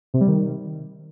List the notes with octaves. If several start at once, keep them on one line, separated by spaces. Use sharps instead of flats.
C3
G3
D#3